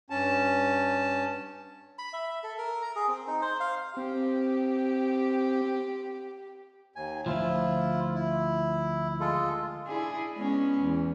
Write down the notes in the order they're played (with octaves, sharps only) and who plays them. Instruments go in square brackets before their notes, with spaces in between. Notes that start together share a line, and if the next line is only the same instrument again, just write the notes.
[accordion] G2 C#4 A5
[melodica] B5
E5
A4
A#4
A#5
G#4
C4
D#4
C5
F5
[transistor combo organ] C4 [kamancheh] G4
[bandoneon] D#2 G#5
[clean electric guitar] D2 F3 [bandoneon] E4 F4
[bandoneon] E4
G#3 F4 A4
[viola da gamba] D4 E4 G#4
G#3 B3 C#4
E2